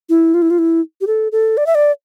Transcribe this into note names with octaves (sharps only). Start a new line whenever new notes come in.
E4
F4
E4
F4
E4
G4
A4
A4
D5
E5
D5